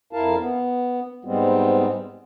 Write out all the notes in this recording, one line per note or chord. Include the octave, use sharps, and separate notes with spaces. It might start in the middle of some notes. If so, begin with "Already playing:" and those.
F2 E4 A#4 F5 A5
B3
G#2 G3 G#3 B3 C4